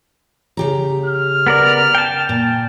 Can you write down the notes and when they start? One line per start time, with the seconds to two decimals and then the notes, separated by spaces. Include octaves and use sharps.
0.57 C#3 G4 A#5
1.06 F6
1.47 B3 A#4 D5
1.95 G5 A5
2.29 A#2